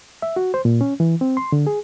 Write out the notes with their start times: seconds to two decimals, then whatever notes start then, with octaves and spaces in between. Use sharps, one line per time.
0.22 E5
0.36 F#4
0.54 C5
0.65 A#2
0.81 C#4
1.00 E3
1.21 C4
1.37 C6
1.52 D3
1.67 G#4